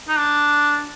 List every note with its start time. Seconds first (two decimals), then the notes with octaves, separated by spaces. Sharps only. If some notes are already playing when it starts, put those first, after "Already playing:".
0.08 D#4
0.18 D4